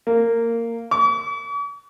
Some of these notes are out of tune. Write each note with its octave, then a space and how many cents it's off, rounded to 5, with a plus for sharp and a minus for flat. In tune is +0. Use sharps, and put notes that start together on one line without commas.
A#3 -15
C#6 +45